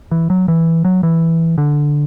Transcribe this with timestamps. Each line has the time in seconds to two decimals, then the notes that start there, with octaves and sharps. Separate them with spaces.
0.11 E3
0.30 F#3
0.48 E3
0.85 F#3
1.03 E3
1.58 D3